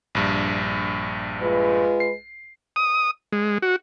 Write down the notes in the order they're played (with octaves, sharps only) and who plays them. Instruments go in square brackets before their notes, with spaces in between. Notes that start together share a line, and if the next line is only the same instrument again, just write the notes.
[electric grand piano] A#1 G2
[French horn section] G#3 F4 B4
[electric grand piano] C7
[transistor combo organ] D#6
G#3
F#4